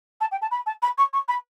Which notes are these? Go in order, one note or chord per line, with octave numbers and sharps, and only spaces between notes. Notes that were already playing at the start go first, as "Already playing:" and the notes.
A5
G5
A5
B5
A5
B5
C#6
C#6
B5